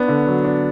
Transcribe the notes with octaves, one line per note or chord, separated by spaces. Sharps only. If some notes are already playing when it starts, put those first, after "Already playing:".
Already playing: B3 D4
D3
F#3
D4